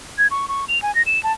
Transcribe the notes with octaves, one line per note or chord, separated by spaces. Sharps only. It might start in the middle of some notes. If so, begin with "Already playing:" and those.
G#6
C#6
C#6
F7
G#5
A#6
E7
A5